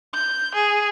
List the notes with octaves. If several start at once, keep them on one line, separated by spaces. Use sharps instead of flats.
G6
G#4